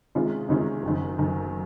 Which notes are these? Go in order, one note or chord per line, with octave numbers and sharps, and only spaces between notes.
C3 D#3 G#3 C#4 F4
C3 D#3 G#3 C#4 F4
F#1 F#2 D#3
F#1 F#2 D#3